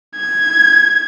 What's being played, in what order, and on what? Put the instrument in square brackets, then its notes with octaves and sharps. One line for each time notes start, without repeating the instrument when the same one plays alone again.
[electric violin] G#6